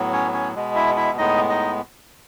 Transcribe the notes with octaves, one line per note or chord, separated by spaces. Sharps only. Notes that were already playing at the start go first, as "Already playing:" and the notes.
Already playing: A2 F#3 B3
C#4 C#5
C#4 C#5
B2 G#3 B3
E4 E5
E4 E5
A2 G#3 B3 D#4 D#5
D#4 D#5